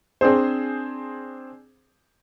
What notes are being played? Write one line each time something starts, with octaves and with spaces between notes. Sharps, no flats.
C4 D4 G#4 C5